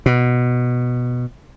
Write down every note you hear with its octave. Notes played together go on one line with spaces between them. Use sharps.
B2